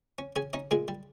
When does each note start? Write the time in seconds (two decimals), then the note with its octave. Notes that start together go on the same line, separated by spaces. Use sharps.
0.18 C#4
0.36 C#4 G#4 G#5
0.53 C#4 D#4 D#5
0.71 A#2 G#3 G#4
0.88 G3